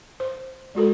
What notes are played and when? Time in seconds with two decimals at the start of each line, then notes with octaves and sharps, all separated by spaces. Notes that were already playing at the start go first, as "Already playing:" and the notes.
0.20 C5
0.75 G#3 F#4 A4 A#4